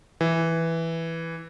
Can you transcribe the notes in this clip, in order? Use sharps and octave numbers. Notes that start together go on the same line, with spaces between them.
E3